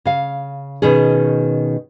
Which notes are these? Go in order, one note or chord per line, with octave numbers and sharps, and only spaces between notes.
C#3 F5
B2 D#3 C#4 G#4